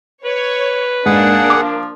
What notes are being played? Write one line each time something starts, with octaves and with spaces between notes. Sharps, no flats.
B4 C#5
G#2 A#3 D4 G#4 F#5
F3 D6